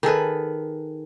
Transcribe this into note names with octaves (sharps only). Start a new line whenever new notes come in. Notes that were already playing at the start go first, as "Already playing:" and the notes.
D#3 G#4 A4 B4